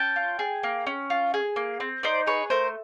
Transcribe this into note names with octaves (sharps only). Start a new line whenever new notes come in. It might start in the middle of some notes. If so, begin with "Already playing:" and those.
Already playing: C#4 G5 A5
F4
G#4
A#3
C#4
F4
G#4
A#3
C4
D#4 C5 D5
G#4 B4 C#5
A3 A#4 C5